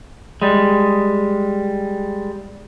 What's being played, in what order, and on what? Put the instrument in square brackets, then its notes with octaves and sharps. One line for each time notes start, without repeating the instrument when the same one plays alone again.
[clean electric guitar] G3 G#3